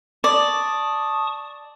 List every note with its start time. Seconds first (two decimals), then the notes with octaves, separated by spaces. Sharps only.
0.24 D5 A5 C#6 D#6